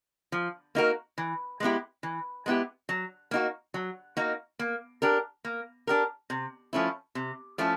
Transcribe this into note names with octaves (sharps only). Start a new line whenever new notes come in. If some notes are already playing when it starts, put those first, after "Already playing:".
F3
A#3 D#4 F#4 A#4
E3
G#3 B3 E4 G4
E3
G#3 B3 E4 G4
F#3
A#3 D#4 F#4
F#3
A#3 D#4 F#4
A#3
D4 G4 A#4
A#3
D4 G4 A#4
C3
F3 A3 C#4 E4
C3
F3 A3 C#4 E4